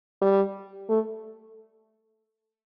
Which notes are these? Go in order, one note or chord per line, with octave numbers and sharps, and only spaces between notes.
G3
A3